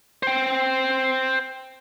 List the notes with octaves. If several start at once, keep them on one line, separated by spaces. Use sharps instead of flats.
C5 G5